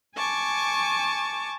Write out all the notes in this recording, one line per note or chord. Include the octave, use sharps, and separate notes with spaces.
G#5 A5 C#6 D6